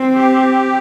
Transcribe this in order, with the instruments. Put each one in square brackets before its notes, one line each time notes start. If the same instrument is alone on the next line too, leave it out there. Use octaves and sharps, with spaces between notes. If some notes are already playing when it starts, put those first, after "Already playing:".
Already playing: [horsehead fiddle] C4
[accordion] G4